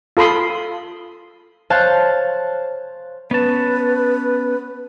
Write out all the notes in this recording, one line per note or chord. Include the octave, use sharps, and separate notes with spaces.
F4 A4 B5 C6 D#6
C5 C#5 F5 A5 F#6
B3 C#4 B4 A5